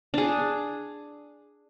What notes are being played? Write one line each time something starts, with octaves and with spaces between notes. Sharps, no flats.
D4 G#4